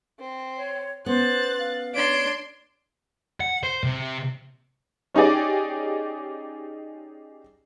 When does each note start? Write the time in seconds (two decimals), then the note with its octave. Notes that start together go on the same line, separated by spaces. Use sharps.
0.19 C4
0.57 C#5
1.06 B3 C#4 C5 F#6 A6
1.59 F5
1.95 D4 C#5 C6 D7
3.40 F#5
3.63 C5
3.84 C3
5.14 C#4 D#4 G4 G#4 D5